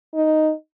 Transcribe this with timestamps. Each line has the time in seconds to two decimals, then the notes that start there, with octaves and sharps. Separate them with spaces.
0.14 D#4